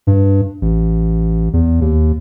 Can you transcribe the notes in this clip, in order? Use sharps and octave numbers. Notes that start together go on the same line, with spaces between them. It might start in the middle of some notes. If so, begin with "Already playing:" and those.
G2
A1
E2
D#2